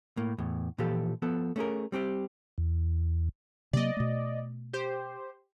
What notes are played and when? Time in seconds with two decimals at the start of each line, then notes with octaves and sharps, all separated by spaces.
0.17 A2 A#3
0.38 E2 A2
0.78 A#2 E3 F3 G4 A4 F5
1.22 F3 B3 A4
1.56 A3 C#4 G#4 A#4
1.92 G3 C4 G4 C5
2.58 E2
3.73 C3 F#3 A#3 D5 D#5
3.97 B2 A3
4.73 G4 C5